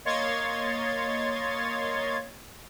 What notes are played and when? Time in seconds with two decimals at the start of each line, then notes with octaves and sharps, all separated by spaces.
0.05 A#3 C#5 D#5 C6 G#6 A6